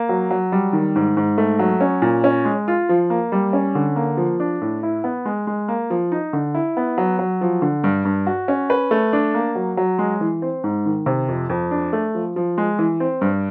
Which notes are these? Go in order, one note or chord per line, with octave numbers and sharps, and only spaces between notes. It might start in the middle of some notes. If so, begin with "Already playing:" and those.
Already playing: A#3
F#3
F#3
G3
D#3
G#2
G#2
A3
F#3
C#4
A#2
C#4
G#3
F4
F3
A#3
G3
C#4
D3
A#3
F3
D4
A2
E4
B3
G#3
G#3
A#3
F3
D#4
D3
E4
B3
F#3
F#3
F3
D3
G2
G2
F#4
C#4
B4
A3
D4
A#3
F#3
F#3
G#3
E3
C4
G#2
D#3
C3
F2
F2
D4
A3
F3
F3
G#3
E3
C4
G2